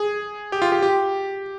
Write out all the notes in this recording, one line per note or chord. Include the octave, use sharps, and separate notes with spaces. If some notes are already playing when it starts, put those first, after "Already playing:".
Already playing: G#4
G4
F4
G4
G4